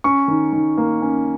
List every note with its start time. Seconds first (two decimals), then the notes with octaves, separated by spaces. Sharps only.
0.04 C#4 C#6
0.28 D#3
0.53 D#3
0.78 A#3
1.02 C#4